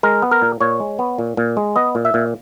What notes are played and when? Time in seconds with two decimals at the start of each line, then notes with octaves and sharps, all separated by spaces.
0.03 G#3 A#4
0.22 B3
0.31 A#4
0.42 A#2
0.61 A#2 C#5
0.80 G#3
0.99 B3
1.19 A#2
1.37 A#2
1.57 G#3
1.76 B3 D#5
1.95 A#2
2.05 E5
2.14 A#2